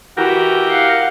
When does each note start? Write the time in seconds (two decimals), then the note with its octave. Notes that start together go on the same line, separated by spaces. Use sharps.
0.17 E3 F#4 G4 A#4
0.70 F5 F#5